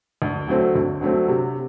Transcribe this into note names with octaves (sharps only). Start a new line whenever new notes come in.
D2
D3 F#3 A3 C4
D2
D3 F#3 A3 C4
C3